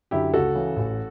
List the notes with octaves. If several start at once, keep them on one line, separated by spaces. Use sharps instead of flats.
F#2 D3 E4 G4
C#2 F#4 A4
C#3 E3
A1